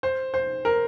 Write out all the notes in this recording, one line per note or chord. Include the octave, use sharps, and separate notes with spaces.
C5
C5
A#4